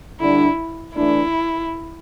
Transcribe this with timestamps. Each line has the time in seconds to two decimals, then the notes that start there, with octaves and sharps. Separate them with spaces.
0.20 D3 G3 D4 E4
0.95 E3 A3 D4 E4